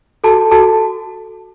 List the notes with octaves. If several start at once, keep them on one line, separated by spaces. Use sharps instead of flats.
F#4 A4 A5
F#4 A4 A5